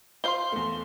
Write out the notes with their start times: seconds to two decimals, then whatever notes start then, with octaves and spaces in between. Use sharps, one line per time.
0.24 F4 C5 F5 C6 G7
0.52 E2 A3